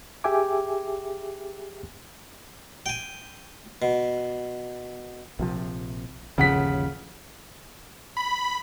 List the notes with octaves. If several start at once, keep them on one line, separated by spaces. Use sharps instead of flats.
G4 G#4 E5 G5 G#5 D6
G5 G#5
B2
A#1 C3 F3
G1 D#2 C#3 F3 F#5 B6
B5